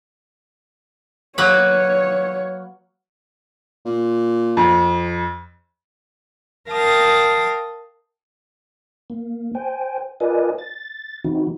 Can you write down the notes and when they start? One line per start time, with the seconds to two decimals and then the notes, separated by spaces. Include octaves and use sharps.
1.38 F#3 A#3 B4 C#5
3.85 A#2
4.57 F2
6.71 A#4 F5 G5 A5 D#6 A#6
9.10 A#3
9.55 C5 G5 G#5
10.20 F4 A#4 B4 D5 D#5 G#5
10.58 A6
11.24 E3 C4 D#4 E4 F#4